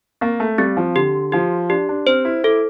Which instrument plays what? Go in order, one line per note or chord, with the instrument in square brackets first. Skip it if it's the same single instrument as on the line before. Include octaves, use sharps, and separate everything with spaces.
[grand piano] A#3 [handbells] C4
[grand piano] A3
[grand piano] G3 [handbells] C4
[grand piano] F3
[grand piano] D3 [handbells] G4
[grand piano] F3 [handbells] G4
[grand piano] D4 [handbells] G4
[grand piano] D4
[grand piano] C4 [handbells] C5
[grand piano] E4
[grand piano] E4 [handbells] A4